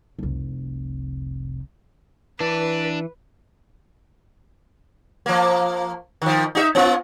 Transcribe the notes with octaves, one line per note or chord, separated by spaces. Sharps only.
F1 C2
E3 D4 B4
F3 A#3
D#3 F3
D#4 F#4 E5
B3 F4